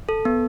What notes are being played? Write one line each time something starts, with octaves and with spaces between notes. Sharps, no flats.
A4
B3